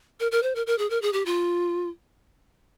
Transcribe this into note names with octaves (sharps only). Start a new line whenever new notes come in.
A#4
A#4
C5
A#4
A#4
G#4
A#4
G#4
G4
F4